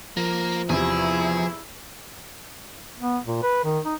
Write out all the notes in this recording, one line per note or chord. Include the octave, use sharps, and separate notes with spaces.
F3 A#3 A#4
E2 C3 E4 G#4
B3
A#2
B4
D#3
D#4